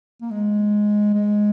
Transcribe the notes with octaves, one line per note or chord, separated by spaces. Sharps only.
A#3
G#3
G#3